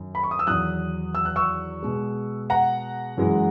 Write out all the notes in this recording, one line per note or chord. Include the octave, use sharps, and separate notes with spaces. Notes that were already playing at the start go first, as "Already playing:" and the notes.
Already playing: F#2 D#3
B5
C#6
D#6
E6
E2 D#3 F#3 D#6 F#6
E6
F#6
C#6 E6
B2 G#3
F#5 A#5
F#2 E3 G#3